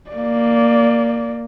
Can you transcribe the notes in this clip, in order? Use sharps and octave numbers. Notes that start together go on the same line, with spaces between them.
A#3 D5